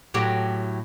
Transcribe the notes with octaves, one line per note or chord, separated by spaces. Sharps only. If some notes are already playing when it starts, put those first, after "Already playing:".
A2 F#3 G4